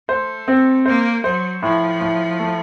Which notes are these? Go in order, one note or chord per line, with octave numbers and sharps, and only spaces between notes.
A3 C5
C4
A#3 C5
F#3 C5
A2 F3
A2
A3